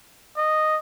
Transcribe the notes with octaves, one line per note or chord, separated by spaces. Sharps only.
D#5